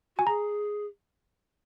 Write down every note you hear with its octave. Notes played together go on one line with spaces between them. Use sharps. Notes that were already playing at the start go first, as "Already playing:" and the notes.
F#4 G#5
G#4 A#5